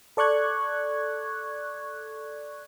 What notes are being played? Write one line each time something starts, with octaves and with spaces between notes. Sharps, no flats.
A4 D5 C#6 F#6 G#6